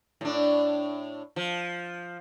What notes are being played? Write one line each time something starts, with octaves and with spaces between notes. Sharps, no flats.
A2 D4
F3